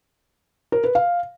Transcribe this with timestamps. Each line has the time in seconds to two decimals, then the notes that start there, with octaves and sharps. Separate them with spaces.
0.72 A#4
0.84 B4
0.95 F5